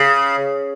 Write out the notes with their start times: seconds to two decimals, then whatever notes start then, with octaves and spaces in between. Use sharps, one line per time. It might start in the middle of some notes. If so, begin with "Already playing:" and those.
Already playing: C#3